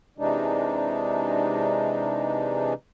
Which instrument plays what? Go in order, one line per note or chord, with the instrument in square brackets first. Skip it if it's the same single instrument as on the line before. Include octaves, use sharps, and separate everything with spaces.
[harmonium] C3 E3 G#3 D4 D#4